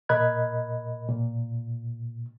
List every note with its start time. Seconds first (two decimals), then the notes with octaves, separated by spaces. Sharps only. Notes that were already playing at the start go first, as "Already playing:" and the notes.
0.09 A#2 A#4 D#5 B5 F#6 G#6
1.09 A#2